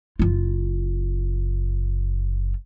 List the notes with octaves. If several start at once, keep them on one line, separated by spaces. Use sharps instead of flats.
F#1 F4